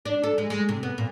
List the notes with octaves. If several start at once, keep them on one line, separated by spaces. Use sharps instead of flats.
D4
A4
G#3
G#3
C3
B3
A#2